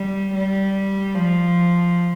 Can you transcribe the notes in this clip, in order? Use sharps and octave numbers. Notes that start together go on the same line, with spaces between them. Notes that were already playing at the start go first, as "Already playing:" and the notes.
Already playing: G3
G3
F3